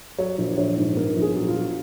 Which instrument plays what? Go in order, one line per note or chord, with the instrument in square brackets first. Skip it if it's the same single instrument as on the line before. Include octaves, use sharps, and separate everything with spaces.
[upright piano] F#3 C#5
A#1
A#1 C#5
G#2
B3 A#4
A#1
G#4
F#3
F4
F#3